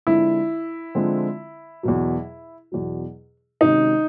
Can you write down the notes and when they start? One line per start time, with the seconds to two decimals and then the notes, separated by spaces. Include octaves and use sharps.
0.07 D3 F3 G#3 C4 E4
0.95 D3 F3 G#3 C4
1.83 E2 B2 F#3
2.72 E2 B2 F#3
3.61 C3 D#3 G#3 C#4 D#4 F#4